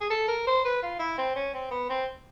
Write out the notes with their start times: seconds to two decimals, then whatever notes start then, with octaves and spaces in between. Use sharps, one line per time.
0.01 G#4
0.10 A4
0.28 A#4
0.47 C5
0.65 B4
0.82 F4
0.99 E4
1.18 C4
1.36 C#4
1.54 C4
1.71 B3
1.89 C4